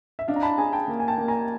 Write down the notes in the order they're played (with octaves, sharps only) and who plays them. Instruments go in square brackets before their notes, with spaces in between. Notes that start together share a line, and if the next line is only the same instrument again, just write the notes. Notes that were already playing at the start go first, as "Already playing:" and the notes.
[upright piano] E5
[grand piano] D4 [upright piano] D#5 F5
[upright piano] A#5
A5 B5
[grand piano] G#4 [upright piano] G#5 A#5
[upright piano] G5 A5
[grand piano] A#3
[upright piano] G#5
G5 A5
[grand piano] A#3
[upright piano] G#5 A#5